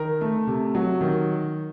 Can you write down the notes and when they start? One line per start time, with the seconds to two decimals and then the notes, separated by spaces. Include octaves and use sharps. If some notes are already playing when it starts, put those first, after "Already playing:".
Already playing: D#3 A#4
0.21 A3
0.47 C3
0.75 F#3
1.01 D#3